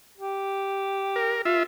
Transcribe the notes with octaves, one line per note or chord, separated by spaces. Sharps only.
G4
A#4
F4 E5